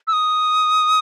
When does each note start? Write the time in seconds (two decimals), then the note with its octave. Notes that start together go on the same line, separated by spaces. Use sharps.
0.07 E6
0.13 D#6